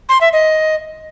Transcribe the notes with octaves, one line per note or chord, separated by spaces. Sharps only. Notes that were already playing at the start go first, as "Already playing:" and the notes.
C6
E5
D#5